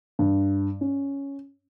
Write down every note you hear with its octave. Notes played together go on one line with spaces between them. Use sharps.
G2
C#4